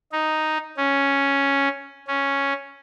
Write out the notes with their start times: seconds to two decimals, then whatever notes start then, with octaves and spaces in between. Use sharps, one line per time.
0.12 D#4
0.77 C#4
2.08 C#4